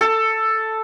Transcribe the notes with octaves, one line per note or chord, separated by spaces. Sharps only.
A4